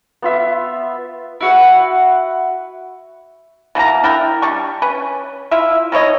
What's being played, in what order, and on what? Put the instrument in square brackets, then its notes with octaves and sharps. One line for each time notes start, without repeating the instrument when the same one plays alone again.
[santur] B3 F4 E5
[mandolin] E4 F#4 B4
[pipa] B2 E3 A#3 A#5
D4 E4 A#4 G5
G3 D4 C#6
C#4 B4
E4 F4 E5
D#3 E4 C#5 D#5